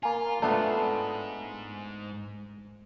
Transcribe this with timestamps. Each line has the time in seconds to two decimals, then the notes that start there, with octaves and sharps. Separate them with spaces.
0.03 A#3 F4 G#5
0.42 F2 G#2 A3 B3 D4 F4